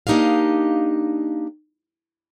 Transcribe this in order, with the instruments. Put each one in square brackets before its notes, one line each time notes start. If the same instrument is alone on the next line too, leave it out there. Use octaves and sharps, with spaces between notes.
[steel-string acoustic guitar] A#3 D4 D#4 G4 D#5 F5